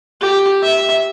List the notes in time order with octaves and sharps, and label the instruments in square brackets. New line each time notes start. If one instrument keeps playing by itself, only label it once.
[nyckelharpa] G4
E5